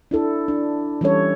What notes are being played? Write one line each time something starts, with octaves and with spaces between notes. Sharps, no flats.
D4 E4 A4
D4
E3 G3 C#4 A4 C#5